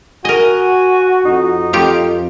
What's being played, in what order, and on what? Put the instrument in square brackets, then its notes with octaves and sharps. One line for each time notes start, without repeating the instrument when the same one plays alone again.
[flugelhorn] F#4 [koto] A#4 D#5 [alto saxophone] G#5
[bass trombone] F2 [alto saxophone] D#4
[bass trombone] F2 [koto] F4 G4